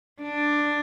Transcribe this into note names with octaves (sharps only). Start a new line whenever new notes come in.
D4